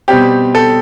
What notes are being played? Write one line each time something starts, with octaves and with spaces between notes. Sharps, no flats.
B2 G3 C4 G4
A4